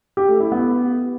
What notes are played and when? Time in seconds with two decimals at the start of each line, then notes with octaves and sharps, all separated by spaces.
0.17 G4
0.29 A3
0.40 E4
0.52 B3